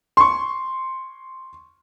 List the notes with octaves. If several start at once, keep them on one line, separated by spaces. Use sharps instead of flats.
C6 C#6